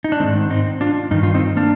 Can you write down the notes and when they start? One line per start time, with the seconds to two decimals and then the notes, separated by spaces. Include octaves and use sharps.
0.04 D#4
0.12 D4
0.20 G#2 D#3 G#3 C4
0.50 C4 D#4
0.81 D4 F4
1.11 G2 D#3 D#4
1.23 F4
1.34 C4 D#4
1.57 A#3 D4